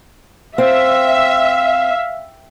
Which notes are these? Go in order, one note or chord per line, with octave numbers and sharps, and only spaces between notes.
C4 E5 F5